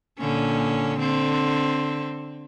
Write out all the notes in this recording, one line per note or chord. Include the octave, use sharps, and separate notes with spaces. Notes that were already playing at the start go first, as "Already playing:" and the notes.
A#2 D3 C#4
D3 C4